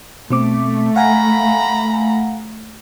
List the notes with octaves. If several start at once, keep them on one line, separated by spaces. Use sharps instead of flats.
B2 A3 C4 D6
F5 F#5 G#5 A#5 B5